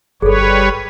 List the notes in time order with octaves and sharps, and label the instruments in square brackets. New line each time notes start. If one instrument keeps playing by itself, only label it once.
[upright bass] G1 [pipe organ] G3 B4 C#5 [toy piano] G#4 A4